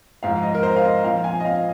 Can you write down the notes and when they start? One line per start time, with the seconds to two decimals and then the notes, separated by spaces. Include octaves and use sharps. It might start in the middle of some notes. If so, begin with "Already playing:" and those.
0.23 G#2 F3 F5
0.43 D#5
0.55 A#4
0.63 C5
0.76 F5
0.84 D#5
1.04 A#2 F3 F5
1.24 G#5
1.40 D#5
1.45 F5